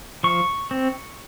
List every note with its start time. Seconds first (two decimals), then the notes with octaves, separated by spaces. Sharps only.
0.23 F3 C#6
0.71 C4